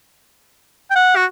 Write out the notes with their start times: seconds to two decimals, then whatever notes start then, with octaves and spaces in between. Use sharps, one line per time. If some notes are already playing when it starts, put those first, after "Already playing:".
0.90 G5
0.96 F#5
1.16 F#4